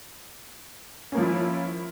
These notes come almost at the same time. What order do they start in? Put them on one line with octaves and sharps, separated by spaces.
C#4 A#3 F3 F4 E4